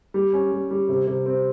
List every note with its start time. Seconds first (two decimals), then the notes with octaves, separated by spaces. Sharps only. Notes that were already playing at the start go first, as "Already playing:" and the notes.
0.14 G3
0.33 C#4
0.52 G3
0.71 G3
0.89 C3
1.07 C3
1.26 C4